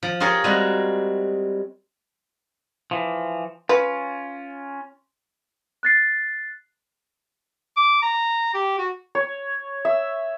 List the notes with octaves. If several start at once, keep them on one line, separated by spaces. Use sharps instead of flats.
F3
F4 G4 G#4 A#4 C#5
G3 G#3 C4 F#4
E3 F3
C#4 F4 B4
F#6 A6 C7
D6
A#5
G4
F#4
C#5
E5